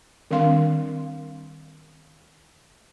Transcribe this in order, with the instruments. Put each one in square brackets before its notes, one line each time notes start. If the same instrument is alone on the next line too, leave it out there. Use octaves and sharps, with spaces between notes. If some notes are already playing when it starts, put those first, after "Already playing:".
[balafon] D#3 G3 C4 D4 F5 C6